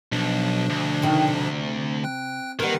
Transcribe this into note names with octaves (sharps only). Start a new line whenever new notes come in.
B1 B2 F3 D4
D2
C3 D#3 E5
C3
G5 F#6
D#3 G3 A#3 B4 F#5